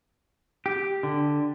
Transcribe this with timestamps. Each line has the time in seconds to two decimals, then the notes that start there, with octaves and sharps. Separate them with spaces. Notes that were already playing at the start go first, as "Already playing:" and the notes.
0.66 G4
1.03 D3